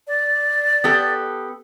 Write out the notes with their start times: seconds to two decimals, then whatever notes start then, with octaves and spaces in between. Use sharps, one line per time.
0.07 D5
0.84 B3 G4 A4